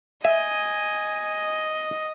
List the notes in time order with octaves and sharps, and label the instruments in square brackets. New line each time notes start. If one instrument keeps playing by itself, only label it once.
[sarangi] D#5 [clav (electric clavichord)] E5 [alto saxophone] G#5